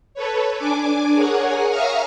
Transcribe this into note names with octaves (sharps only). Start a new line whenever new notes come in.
A4 B4 C#5
D4 G#5 D6
G#4 A#4 C#5 F#5 G#5
E5 F5 A#5 C#6 D#6 F6